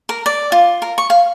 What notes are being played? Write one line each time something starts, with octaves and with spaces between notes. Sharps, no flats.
A#4
D5
F4
A#4
C#6
F5